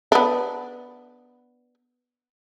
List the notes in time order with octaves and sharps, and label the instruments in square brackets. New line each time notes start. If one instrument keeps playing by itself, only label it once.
[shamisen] B3 D4